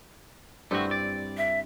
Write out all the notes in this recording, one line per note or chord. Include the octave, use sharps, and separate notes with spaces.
G2 A3 C4 E4 F#4
D5
E5